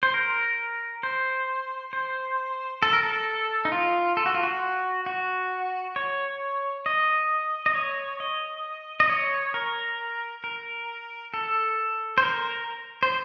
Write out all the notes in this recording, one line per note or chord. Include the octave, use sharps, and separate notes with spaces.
C5
A#4
C5
C5
A4
A#4
A4
D#4
F4
A4
F#4
F4
F#4
F#4
C#5
D#5
D#5
C#5
D#5
D#5
C#5
A#4
A#4
A4
C5
A#4
C5